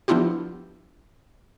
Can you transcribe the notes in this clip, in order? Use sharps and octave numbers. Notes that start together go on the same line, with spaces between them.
F3 B3 D4 E4 F4 G4